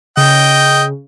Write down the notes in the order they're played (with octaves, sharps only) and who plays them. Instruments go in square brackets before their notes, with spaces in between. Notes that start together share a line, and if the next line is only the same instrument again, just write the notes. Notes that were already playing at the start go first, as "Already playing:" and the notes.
[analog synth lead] C#3 [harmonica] D#5 G5